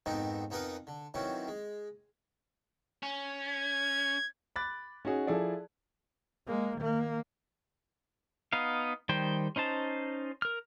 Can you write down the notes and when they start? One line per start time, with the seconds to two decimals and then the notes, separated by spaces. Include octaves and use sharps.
0.06 F2 G#2 D#3 B3 C4 D#4
0.51 F2 B3 D#4 A#4 B4 D#6
0.87 D3
1.14 D#3 E3 F#3 C4 C#4
1.48 G#3
3.03 C#4
3.48 G#6
4.56 B5 D6 F#6 A6
5.05 C#4 D#4 F#4 G#4
5.27 F3 E4 G#4 A4 D5
6.47 G#3 A#3
6.77 D#3 A#3
8.53 B3 D#4 F5
9.09 D#3 G3 C5 G5
9.56 C#4 D#4 C5 A5
10.42 A#4 F6